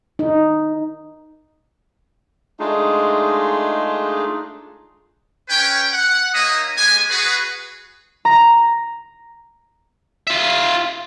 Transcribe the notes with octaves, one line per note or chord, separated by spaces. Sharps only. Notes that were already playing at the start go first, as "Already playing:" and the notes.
D#4
G#3 A3 D4 D#4 F4 G#4
C#4 B4 C#5 G5
F#5
A#3 D#4 C#5 D#5 E5 D#6
G#3 B3 G4 G#5
F#4 G#4 B4
A#5
F4 E5